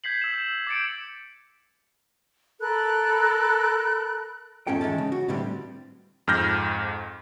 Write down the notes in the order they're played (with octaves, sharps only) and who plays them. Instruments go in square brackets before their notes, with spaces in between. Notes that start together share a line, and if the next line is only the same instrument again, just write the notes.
[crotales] G6 G#6 B6 C7 F#7
E6 E7
D6 G6 A6 B6 C#7 D7
[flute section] A4 A#4 B5 F#6
[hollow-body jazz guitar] E2 G#2 F3 C#4 A4 G5
D#3 E3 G#3 C#4 A5
C#3
F#4
A2 D3 E3 G3 C4
[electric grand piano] F2 G#2 F6 G6 A#6